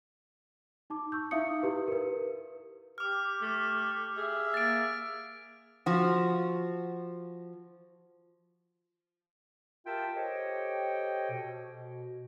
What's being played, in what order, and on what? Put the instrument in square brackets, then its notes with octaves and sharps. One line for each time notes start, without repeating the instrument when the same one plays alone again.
[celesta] D#4 A5 D6
C#6 E6 G6
D#4 E4 E5 F5 D#6 C#7
E4 G4 B4
A#4 B4
[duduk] G4 [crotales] D6 F6
[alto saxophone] A3
[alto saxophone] G#4 [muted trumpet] E5
[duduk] A#3 [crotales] A6 D7
[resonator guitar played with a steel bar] F3 F#4
[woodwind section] F4 G4 A#4 E5 G5 A5
G4 A4 C5 C#5 D#5 G5
B2